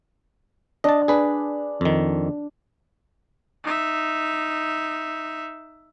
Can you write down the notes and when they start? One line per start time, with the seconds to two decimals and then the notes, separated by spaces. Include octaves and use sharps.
0.84 D4 D#5 A5
1.08 D4 G#4 B4
1.81 F2 D#3
3.64 D#4 E5